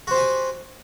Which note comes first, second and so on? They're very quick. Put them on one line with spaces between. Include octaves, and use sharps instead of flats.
F#4 C5 G4 G#5